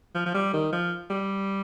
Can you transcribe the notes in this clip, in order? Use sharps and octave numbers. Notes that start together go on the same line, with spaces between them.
F3
F3
G3
D#3
F3
G3